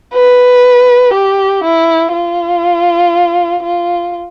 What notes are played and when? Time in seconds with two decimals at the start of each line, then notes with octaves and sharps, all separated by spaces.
0.14 B4
1.14 G4
1.64 E4
2.13 F4
3.63 F4